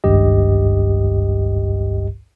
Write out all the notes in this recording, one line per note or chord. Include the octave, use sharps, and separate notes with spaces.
G#1 C#2 G2 G4 D#5